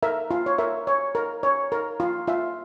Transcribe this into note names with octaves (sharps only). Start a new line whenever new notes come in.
A#4 E5
F4
C#5
A#4 E5
C#5
A#4
C#5
A#4
F4
F4 E5